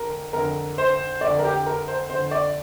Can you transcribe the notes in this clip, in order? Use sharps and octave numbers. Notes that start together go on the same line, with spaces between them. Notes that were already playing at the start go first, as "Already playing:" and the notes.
Already playing: F2 D3 A#4
F2 D3 A#4
C5
F2 D3 D5
A#4
G4
A#4
C5
F2 D3 C5
D5